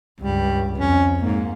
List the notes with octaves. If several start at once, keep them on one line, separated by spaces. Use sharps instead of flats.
C#2 G2 G3
F2 C#4
G#2 A#3